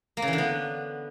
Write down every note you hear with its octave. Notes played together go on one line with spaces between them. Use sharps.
A#3
C#3
E3
D3
B3